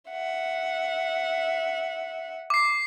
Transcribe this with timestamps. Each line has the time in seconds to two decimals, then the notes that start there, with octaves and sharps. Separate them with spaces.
0.10 E5 F#5
2.50 D6 C7